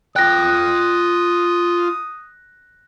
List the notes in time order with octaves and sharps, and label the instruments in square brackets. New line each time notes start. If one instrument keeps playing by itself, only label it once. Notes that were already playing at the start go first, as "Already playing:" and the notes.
[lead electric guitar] F4 G5 [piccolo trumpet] D#6 [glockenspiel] F#6 A#6